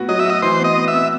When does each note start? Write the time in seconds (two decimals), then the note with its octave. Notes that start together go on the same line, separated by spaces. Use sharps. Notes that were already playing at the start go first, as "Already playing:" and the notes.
Already playing: A2 B3 F#4
0.08 F#3 D#5
0.19 E5
0.25 F#4 D#5
0.42 E3 C5
0.59 B3
0.64 D#5
0.76 B3
0.88 E5
0.93 B3